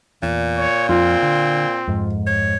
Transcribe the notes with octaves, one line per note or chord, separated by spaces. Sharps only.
E2 A#2
C#5
F2 C4 F4
D3
F2 G#2
C#5